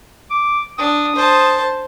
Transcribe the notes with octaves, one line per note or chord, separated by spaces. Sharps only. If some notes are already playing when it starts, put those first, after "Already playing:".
D6
D4 D#6
C5 A5